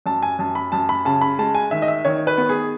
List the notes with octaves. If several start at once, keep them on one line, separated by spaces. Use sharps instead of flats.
F#2 A5
G#5
F#2 A5
B5
F#2 A5
B5
C#3 A5
B5
G#3 A5
G#5
D#3 E5
D#5
E5
D#3 C#5
B4
B3
G#4